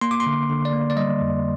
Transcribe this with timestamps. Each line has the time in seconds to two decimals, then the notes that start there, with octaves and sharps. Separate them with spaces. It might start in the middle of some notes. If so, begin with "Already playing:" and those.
0.01 A#3 C6
0.11 D6
0.20 C6
0.26 D3
0.49 D3
0.65 D5
0.73 A#3
0.90 D5
0.97 G3 D#5
1.21 F2